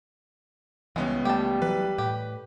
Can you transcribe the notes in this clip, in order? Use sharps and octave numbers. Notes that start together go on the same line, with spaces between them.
C#2 E3 G3 G#3 B3 C#4
G3 A3 G4 A5
E3 F#3 B4
A2 G4